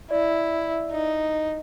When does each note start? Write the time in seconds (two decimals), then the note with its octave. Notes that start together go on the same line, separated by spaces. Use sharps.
0.11 E4 D5
0.91 D#4